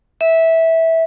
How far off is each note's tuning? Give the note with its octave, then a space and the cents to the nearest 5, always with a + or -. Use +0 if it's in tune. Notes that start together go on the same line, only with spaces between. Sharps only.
E5 -15